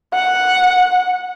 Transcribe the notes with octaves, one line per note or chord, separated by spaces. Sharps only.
F#5